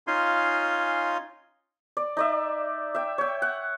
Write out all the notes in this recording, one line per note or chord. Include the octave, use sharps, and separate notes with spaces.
C#4 D#4 F4 F5 G#5 C6
D5
D#4 D5 E5
E5 G5
C#5 G5
F#5